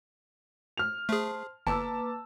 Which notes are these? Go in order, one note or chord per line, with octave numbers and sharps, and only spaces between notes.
F6 F7
A3 G#4 C5 A5 C6
G1 A#3 B4 A5 D6 E6